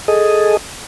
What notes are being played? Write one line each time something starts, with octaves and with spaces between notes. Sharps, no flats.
G#4 A4 D#5